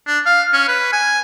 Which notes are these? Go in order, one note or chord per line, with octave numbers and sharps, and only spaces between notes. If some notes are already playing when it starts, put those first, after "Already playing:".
D4
F5
C#4
B4
G#5